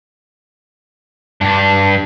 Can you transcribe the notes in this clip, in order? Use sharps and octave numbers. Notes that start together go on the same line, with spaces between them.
G2 D4